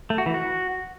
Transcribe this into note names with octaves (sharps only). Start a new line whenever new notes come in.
A3
F#4
E3
F#4